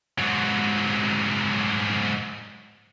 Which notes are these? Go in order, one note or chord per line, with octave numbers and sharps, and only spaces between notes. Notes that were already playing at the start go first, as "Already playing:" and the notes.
G#2 F#3